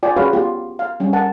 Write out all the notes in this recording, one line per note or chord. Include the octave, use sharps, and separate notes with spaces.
F4 D5 G5 G#5
C#4 F#4 G#4 B4 C#5 F5
B3 F4 G4
F5
G3 C#4
A#4 F#5 A5